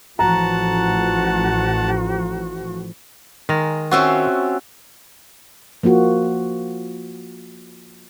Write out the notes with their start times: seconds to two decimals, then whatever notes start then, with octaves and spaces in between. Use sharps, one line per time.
0.19 A1 F3 F#4 F#5 A5 A#5
3.49 D#3 G#3 A#5
3.91 C4 C#4 F4 F#4 E5
5.83 F3 A#3 F4 F#4